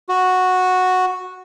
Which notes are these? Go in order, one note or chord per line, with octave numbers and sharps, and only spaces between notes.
F#4